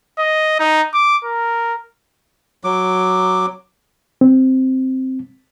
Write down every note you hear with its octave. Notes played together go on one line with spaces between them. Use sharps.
D#5
D#4
D6
A#4
F#3 D6
C4